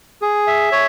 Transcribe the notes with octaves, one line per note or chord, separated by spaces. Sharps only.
G#4
E5
C#5